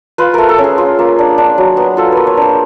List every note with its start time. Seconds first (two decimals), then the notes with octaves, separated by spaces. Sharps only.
0.18 F4 B4
0.34 A3 A#4
0.49 A4
0.58 C#4
0.64 G#4
0.78 F4
0.99 A#3
1.19 D4
1.38 D4
1.58 F#3
1.77 B3
1.97 F4 A4
2.12 A#3 B4
2.27 C#5
2.37 D4 C5